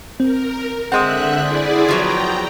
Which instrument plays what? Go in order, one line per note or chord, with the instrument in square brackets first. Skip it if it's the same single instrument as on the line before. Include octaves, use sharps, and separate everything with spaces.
[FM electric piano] C4 [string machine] A#4
[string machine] D3 E5 F#6 [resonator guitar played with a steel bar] G#3 C4 [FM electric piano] F#5 C6 D#6
[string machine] E4 G#4 D5
[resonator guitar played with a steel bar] F3 F#3 B3 [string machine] G5 A#5